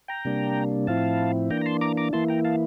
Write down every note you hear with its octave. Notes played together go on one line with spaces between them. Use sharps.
G5 A#5
C3 G3 A#3 D4
A2 F3 C4 E4 F5 A5
E3 A#3 D4 G5 A#5
A#5
A5 C6
A#5 D6
A#5 D6
E3 A#3 E4 A5 C6
G5 A#5
F5 A5